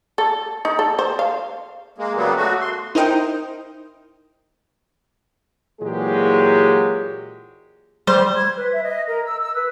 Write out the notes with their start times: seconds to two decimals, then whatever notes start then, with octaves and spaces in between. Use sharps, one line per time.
0.18 A4
0.65 D#4
0.79 A4
0.99 C5
1.19 F5
1.98 G#3 A#3
2.16 C#3 F#3 G3 A#3 B3
2.36 A3 F#4
2.60 C6
2.95 D#4 E4 A#4 C5 D#5 G5
5.81 A#2 E3 F#3 G#3 G4 G#4
8.07 G3 C5
8.35 G#6
8.56 B4
8.72 E5
8.84 D#5
9.08 A#4
9.25 E6
9.41 E6
9.55 B4